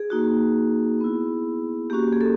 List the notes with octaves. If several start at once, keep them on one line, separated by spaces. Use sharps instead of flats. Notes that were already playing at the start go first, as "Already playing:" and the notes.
Already playing: G#4
A#3 D#4 F#4
B3 E4
A#3 C#4 F#4 G4
G#4
A4